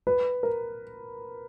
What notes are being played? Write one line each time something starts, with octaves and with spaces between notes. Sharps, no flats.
B4
A#4